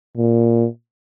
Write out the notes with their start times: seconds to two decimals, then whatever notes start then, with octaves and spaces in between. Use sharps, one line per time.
0.17 A#2